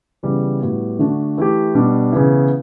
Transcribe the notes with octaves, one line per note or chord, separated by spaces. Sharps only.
C#3 E3 G3 B3
A2 G3 B3 F#4
D3 A3 D4 F#4
E3 A3 E4 G4
B2 G3 D4
C#3 E3 B3 E4